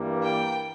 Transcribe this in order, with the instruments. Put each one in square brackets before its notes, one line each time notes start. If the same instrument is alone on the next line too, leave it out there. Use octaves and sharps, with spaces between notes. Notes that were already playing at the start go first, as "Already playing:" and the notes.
Already playing: [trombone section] G2 E3 G3 A#3
[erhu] G5